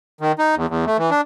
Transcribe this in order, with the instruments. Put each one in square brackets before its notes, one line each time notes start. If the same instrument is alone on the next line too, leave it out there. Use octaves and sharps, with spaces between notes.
[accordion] D#3
D#4
E2
E2
A3
E3
D4